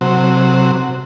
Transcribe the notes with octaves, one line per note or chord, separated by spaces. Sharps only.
C3 F#3